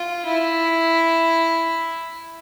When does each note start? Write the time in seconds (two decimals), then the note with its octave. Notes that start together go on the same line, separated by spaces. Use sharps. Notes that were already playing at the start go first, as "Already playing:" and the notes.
Already playing: F4
0.26 E4